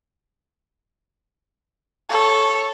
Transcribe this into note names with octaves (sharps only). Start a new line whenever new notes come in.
A4 C#5